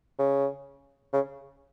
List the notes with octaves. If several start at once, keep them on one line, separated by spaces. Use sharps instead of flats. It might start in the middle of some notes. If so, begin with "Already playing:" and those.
C#3
C#3